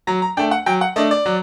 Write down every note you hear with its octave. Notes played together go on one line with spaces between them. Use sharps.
F#3 A#5
A#5
A3 D4 G5
F#5
F#3 G5
F#5
A3 D4 D#5
D5
F#3